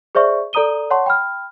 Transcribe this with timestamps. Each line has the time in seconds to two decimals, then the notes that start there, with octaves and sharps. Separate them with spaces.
0.15 G#4 C5 D5 E5 C#6
0.53 A4 D5 A#5 D#6 D#7 G7
0.90 C#5 F#5 A5 C6 C#6
1.06 G5 B5 F6